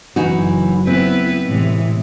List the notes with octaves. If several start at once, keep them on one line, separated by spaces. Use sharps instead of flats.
F#1 E3 F#3 D#4 F#4
B3 C4 E4 B4
A2 C3 E3 G#3